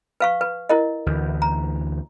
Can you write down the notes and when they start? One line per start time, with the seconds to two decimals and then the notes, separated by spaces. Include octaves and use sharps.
0.20 B4 F5 C#6
0.41 B4
0.69 E4 A#4 D#5
1.06 D2 E3
1.42 A#5